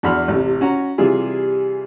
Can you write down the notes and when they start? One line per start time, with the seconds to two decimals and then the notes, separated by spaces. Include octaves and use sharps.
0.03 E2 D4 F#4 B5 C6 F6
0.28 A1 C3
0.61 C#4 F#4 A#5
0.98 C3 E3 G3 F4 G#4